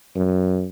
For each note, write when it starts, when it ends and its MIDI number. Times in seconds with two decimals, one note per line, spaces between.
0.16 0.68 42